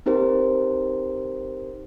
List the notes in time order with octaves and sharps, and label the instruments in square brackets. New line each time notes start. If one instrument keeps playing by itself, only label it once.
[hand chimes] C4 D#4 G4 A#4 C5